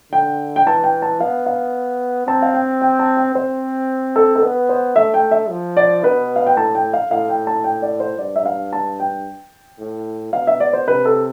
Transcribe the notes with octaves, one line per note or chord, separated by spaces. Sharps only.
D3 G5
G5
E3 A5
G5
A5
B3 F5
F5
C4 A5
F5
G5
G5
A5
G5
C4 C5
A4
A4
B3 B4
C5
A3 E5
G5
E5
F3
D5
B2 B4
F5
G5
A2 A5
G5
F5
A2 F5
G5
A5
G5
D5
C5
G2 D5
E5
F5
A5
G5
A2
B2 F5
E5
D5
C5
C3 B4
A4